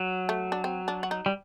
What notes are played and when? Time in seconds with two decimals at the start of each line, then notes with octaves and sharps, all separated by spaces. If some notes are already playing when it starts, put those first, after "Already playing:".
Already playing: F#3
0.29 A3
0.52 D4
0.64 C4
0.88 D4
1.03 F#4
1.11 D#4
1.26 G3